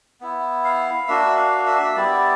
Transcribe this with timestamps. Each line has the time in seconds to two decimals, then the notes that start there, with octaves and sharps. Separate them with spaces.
0.21 B3 E4
0.65 F5
1.08 A#3 D4 F#4 E5
1.37 F5
1.66 E5
1.95 G3 B3 E4 D5